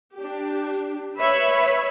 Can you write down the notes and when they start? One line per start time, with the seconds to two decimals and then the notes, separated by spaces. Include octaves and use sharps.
0.15 D4 G4
1.18 B4 C#5 E5 B5